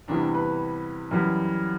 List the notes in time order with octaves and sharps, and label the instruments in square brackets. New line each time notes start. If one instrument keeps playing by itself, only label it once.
[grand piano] E2 C3 E3 G3 D4
B4
F#2 E3 G3